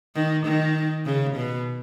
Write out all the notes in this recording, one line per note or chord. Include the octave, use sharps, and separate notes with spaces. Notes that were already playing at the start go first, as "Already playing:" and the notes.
D#3
D#3
C#3
B2